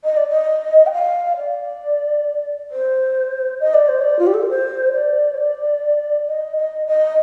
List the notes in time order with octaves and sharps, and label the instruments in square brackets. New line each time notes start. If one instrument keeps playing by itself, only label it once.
[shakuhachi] D#5
D5
D#5
G5
F5
D5
C5
D#5
D5
C5
D5
F4
G4
A4
A#4
C5
D5
C5
D5
D#5
D#5
D#5